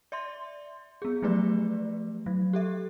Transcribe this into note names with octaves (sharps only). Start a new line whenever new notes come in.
D5 E5 C6
B3 G#4
F3 F#3 A3 G4 B4 D5
F#3
G4 A4 E5